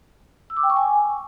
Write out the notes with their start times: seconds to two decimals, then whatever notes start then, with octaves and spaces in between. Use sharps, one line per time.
0.50 E6
0.57 D6
0.63 G5
0.70 C#6
0.77 G#5